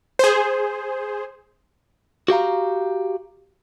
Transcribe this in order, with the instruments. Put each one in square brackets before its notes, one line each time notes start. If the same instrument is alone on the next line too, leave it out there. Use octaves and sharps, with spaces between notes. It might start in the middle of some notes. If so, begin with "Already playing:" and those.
[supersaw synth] G#4 C5
[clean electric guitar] F#4 G4 F5 A#5